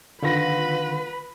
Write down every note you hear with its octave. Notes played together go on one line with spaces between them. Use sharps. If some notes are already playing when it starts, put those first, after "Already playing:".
D3 D#3 F4 B4 F#5 B5 A#6